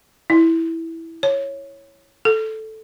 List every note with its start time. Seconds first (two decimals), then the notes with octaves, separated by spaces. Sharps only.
0.30 E4
1.23 C#5
2.25 A4